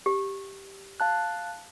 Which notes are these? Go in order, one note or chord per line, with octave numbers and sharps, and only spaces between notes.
G4
F5 A5 F#6